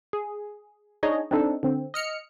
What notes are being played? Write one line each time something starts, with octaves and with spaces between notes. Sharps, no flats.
G#4
D4 D#4 G#4 C#5 D#5
C4 D4 D#4 A4
D3 C4
D#5 F6 C#7